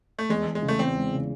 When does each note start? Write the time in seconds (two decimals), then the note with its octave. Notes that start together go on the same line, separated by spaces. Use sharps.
0.19 A3
0.29 E2 G#3
0.46 E2
0.55 G#3
0.62 C#3
0.68 A3
0.79 E2 C4
0.95 G#3
1.13 C#3